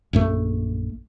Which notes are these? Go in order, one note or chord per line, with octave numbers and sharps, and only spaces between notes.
A#1 F#2 A3